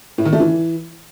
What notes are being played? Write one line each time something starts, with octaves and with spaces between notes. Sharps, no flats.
A2
D#3
A3
E3